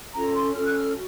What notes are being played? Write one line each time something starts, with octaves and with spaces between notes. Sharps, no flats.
C#4 F4 A4 C#5 A#5
C6
C#4 F4 A4 C#5 F6
F#6
F6
F#4